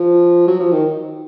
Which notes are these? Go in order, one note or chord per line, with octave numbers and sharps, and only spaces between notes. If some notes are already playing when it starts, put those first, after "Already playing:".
Already playing: F3
F#3
F3
D#3